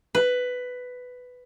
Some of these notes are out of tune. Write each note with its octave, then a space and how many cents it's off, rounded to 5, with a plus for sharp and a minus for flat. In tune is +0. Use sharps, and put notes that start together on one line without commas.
B4 +10